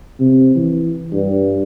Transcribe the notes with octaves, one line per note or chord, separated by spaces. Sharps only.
C3
E3
G2